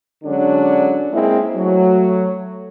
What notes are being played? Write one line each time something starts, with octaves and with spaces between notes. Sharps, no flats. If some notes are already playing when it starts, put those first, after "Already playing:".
D3 F#3 G#3 C#4 D4
G#3 A#3 C4 E4
F#3 A3